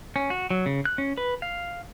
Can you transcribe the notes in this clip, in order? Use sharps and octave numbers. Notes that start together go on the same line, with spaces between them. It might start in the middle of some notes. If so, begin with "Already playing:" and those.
C#4
F#4
F#3
C#3
F#6
C#4
B4
F5